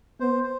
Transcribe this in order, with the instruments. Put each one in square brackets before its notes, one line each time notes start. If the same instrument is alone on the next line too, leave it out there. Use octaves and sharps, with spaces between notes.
[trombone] B3 [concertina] C5
[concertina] C5